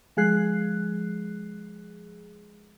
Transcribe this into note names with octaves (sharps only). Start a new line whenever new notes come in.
F3 G#3 G#4 F#6 C7